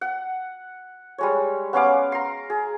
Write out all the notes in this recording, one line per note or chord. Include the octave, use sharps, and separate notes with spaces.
F#5
G3 G#3 C#5
B3 C#4 F5 D6
A#5 C6
G#4